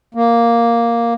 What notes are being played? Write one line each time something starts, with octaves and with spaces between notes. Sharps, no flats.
A#3